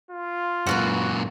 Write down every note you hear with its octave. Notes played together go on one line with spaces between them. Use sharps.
F4
F#2 A#2 F#4 A4 B4